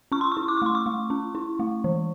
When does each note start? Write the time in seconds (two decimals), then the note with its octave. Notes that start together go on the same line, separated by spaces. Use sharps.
0.12 C#4 C#6
0.21 C6
0.32 C#6
0.37 E4
0.48 D6
0.57 C#6
0.62 A3 C6
0.75 C#6
0.86 A3
1.10 C#4
1.35 E4
1.59 A3
1.84 E3